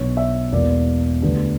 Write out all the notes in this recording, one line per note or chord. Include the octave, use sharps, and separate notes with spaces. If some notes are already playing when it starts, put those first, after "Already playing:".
Already playing: B1 B2 F#3 B3 D4 C#5
E5
E1 E2 B2 A#3 D5
D2 D3 G3 B3 D4